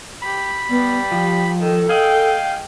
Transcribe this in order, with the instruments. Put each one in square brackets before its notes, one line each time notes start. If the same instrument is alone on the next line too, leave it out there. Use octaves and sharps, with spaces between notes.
[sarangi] G4 [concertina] B5
[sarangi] G3 [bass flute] B3
[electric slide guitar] F3 [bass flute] G4
[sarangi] D#3 [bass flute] A4
[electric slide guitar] G#4 D#5 [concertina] F5 [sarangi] G5